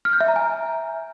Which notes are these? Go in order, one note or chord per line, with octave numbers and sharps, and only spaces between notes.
F6
G6
E5
A#5
G#5